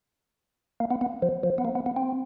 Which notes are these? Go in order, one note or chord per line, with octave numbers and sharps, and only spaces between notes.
A#3
B3
B3
F3
F3
B3
A#3
B3
B3
C4